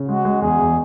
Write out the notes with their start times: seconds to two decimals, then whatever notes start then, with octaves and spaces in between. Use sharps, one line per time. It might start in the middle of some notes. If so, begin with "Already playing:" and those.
Already playing: C#3
0.08 G#3 F#4
0.25 G#3
0.42 E2 G#4
0.59 E2